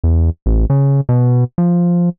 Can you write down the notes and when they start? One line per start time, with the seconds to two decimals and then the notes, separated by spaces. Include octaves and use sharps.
0.04 E2
0.46 A1
0.70 C#3
1.09 B2
1.58 F3